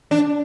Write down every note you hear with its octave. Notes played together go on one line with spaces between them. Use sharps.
D4